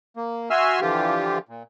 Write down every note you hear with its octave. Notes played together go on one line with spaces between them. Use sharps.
A#3
F#4 E5 G#5 C6 E6 F6
D3 E3 F3 F4 G4
A#2